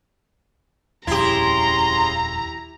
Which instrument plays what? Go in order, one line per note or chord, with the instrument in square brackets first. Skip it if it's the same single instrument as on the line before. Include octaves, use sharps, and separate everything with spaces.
[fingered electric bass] D#1 F2 [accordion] C#3 C6 [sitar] E4 G4 [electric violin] A#5